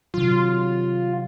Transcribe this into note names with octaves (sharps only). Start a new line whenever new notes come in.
C3 D#3 F#3 F4